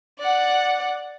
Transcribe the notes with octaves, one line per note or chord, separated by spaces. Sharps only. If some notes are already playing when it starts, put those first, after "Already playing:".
D5 F#5